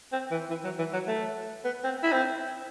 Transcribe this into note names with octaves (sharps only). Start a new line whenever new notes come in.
C4
E3
E3
F#3
E3
F#3
A3
B3
C4
E4
C4